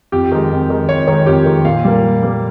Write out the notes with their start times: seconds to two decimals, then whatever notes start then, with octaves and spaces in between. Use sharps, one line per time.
0.12 F2 G4
0.32 D#3 G#3
0.51 F2
0.70 D#3 G#3
0.88 F2 C#5
1.07 D#3 G#3 C#5
1.26 F2 G4
1.46 D#3 G#3
1.65 A#2 F5
1.84 G3 A#3
2.03 A#2
2.23 G3 A#3